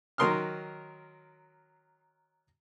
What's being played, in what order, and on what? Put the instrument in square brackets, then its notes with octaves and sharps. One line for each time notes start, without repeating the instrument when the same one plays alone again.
[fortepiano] D#3 F#3 A#4 C6 D#6 F6